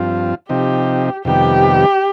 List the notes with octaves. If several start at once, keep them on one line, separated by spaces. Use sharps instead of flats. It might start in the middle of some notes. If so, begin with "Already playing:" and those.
Already playing: G2 F3 C4 F4
C3 F3 C4 D#4 G4
F2 C3 D#3 G3 B3 G4